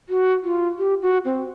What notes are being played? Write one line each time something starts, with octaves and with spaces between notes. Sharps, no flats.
F#4
F4
G4
F#4
C4